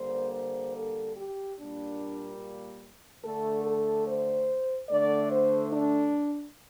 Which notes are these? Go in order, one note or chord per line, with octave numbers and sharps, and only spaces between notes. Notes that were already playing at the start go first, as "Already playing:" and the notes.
Already playing: D3 G3 A#3 C5
C5
A4
G4
A#2 G3 A#3 D4
D3 A3 A4
A4
C5
D3 A3 D5
C5
D4